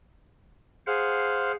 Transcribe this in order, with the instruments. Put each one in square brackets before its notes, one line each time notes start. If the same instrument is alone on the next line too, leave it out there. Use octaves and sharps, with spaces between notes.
[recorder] G#4 [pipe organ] C5 F5 F#5